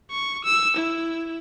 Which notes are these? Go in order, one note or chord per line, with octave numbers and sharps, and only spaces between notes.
C#6
E6
E4